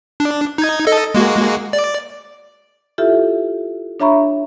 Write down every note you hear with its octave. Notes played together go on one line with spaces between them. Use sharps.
D4
D#4 G#6
A4 D#5
G#3 A#3 F#4
D5
E4 F4 G4 A4 E5
D4 C#5 E5 A#5 B5 C#6